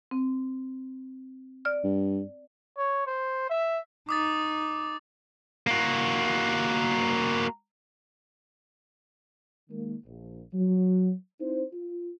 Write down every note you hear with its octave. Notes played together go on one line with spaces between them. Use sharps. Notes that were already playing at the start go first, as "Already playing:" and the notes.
C4
D5 F6
G2
C#5
C5
E5
D#4 D6 D#6 A6
A#3 F#4
D#3 G#3 A#3
A#1
F#3
C4 D#4 E4 C5
F4